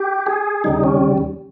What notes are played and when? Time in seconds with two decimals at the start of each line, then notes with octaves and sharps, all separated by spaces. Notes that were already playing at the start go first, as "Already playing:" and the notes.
Already playing: G4
0.26 G#4
0.64 D#2 C#3 G3 D#4
0.84 C#4